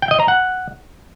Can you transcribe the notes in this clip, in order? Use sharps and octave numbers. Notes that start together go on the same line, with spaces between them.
G5
D#5
A#5
F#5